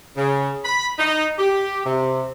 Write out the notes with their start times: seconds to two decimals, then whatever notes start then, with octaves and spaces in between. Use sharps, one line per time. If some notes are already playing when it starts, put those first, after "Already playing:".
0.17 C#3
0.65 B5
0.99 D#4
1.39 G4
1.86 C3